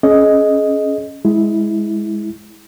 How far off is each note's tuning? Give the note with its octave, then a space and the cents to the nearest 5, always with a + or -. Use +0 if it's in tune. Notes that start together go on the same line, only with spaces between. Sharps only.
C#4 +0 G#4 +35 D#5 +0
G#3 +0 E4 -15